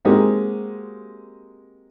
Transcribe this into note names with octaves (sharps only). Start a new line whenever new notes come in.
G#3 A#3 C4 D#4 F#4 G4